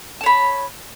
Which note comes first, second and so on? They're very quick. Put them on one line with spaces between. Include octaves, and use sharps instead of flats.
A5 C#5 B5